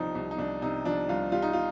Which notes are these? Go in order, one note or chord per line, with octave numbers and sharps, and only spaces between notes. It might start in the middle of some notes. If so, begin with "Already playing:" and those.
Already playing: C2 C3 F3 D4 D#4
C2
D#4
C2 D4
C3 D#4
F3 D4
C2 F4
G3 F4
D#4
F4